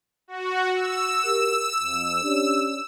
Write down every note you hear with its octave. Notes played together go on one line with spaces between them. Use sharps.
F#4
E6
G4 A#4
F2
C#4 D4 G4